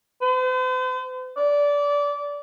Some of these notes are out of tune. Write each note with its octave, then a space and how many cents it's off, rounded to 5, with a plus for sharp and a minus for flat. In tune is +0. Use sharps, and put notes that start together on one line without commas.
C5 -45
D5 -20